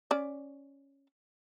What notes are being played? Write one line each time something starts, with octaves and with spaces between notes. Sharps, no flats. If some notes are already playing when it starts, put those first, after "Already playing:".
C#4 D5